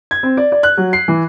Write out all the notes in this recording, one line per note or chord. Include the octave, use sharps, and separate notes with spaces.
G#6
C4
D5
D5
F#6
F#3
C7
E3